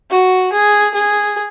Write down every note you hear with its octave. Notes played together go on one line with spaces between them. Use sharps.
F#4
G#4
G#4